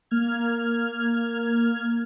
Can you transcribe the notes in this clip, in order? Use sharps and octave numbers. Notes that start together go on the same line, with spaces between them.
A#3 F6 G#6